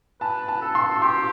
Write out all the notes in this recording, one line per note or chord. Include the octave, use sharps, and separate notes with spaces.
B4 A5
A5
A4
C6
G4 C6